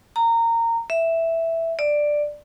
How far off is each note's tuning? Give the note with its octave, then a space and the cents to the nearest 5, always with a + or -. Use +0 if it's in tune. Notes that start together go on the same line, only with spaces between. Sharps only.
A#5 -20
E5 +0
D5 +10